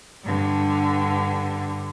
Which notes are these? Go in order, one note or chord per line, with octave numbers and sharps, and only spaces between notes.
G2 D3